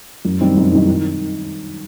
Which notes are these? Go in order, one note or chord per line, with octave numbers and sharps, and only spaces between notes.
F#2
D#3 G3 C4 D#4
F#2
D#3 G3 C4 D#4
D#3